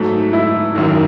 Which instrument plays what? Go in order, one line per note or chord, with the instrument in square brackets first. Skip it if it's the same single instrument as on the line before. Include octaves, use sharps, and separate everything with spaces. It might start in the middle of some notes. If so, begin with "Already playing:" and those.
Already playing: [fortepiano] G#2 F#3 A3
[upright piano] E4
[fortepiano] G#1 F#2 D#3